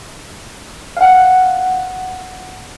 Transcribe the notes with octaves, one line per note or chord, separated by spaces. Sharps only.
F5 F#5